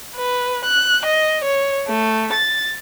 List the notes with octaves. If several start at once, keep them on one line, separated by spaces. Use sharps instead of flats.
B4
F#6
D#5
C#5
A3
A6